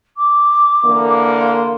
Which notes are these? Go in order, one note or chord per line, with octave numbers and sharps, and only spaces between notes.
D6
D3 E3 A#3
C6